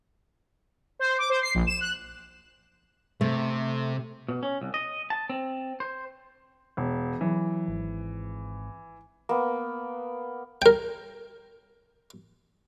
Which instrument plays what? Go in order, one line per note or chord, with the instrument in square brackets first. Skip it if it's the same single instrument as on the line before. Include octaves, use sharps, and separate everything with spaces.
[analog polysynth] C5
D6
C5
C7
A#1
E7
F#6
[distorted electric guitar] C3 [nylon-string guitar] A3
[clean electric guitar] B2
C#4
C2
D#5
A5
C4
C5
[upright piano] E1
[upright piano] E3 [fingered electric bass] F#3
[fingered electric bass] G#1
[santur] A#3 B3
[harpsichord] A#4 G5